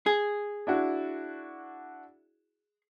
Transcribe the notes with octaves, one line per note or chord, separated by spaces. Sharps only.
G#4
D4 E4 F#4